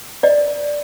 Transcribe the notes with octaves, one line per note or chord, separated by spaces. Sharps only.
D5 D#5